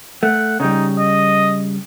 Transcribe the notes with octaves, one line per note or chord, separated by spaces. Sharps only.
A3 F#5
C#3 G3 D#4
D#5